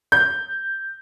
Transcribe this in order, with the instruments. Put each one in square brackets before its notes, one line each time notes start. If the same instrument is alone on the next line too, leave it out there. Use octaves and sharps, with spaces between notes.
[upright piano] G6